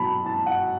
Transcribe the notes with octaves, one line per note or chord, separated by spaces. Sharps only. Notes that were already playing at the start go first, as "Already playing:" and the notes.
Already playing: B2 F#3 A5 B5
A5
F#5